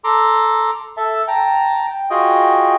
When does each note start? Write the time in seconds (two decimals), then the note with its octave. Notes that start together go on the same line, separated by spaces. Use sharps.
0.04 A4 A#5 C6 D6
0.97 A4 E5 A5
1.28 G5 A5 A#5
1.90 G5
2.10 F4 F#4 G#4 D#5 G5